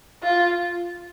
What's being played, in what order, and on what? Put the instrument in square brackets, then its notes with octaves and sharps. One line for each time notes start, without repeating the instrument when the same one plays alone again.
[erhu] F4